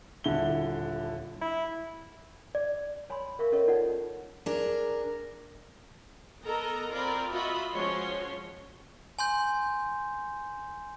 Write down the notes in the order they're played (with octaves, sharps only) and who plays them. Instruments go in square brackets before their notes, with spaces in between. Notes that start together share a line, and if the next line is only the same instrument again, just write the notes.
[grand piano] D#1 D3 E4 G7
[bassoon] E4
[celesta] D5
[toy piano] C#5 G#5 B5 C6
A#4 E5 F5 C#6
C#4 A4 A#4 C#5 D#5 C#6
D#4 F4 A4 C#5 D5 F#5
[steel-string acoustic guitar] D4 G#4 A#4
[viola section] B3 A4 A#4 D#5 A#5
C4 F4 A#4 D5 B5
F4 F#4 D#5 E5 B5
F3 G#3 C#4 F#4 C#5 C6
[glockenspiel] G#5 C6 G6